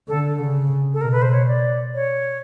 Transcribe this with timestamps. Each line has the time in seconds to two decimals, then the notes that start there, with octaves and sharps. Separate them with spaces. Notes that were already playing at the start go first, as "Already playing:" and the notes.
0.08 D3 A4
0.39 C#3
0.94 A4
1.01 B2 A#4
1.12 B4
1.22 C5
1.32 C#5
1.47 D5
1.95 C#5